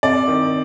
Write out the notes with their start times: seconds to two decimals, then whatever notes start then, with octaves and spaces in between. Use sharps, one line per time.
0.03 C3 D5
0.28 D#3